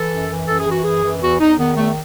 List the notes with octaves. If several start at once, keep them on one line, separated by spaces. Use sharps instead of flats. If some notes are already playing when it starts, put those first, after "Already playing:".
Already playing: E3 A4
F#2
E3
F#2 A4
G#4
E3 F#4
F#2 G#4
E3
E2 F#4
E2 D#4
D#3 B3
E2 A3